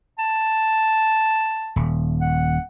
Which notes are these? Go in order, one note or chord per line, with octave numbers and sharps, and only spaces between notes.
A5
D#1
F#5